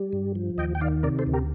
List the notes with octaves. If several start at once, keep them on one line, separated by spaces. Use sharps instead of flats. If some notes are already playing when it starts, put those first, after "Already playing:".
Already playing: G3
G2
F3
D#2 D#5 G5
G5
D#3 D5 F5
C3 A#4 D5
A4 C5
D2
G4 A#4